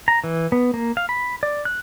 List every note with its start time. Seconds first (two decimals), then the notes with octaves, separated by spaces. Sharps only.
0.08 A#5
0.24 E3
0.52 B3
0.74 A#3
0.97 F5
1.09 B5
1.43 D5
1.65 F#6